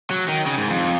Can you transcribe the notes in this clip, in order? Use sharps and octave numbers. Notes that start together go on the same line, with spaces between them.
F#3
D#3
C#3
G#2
F2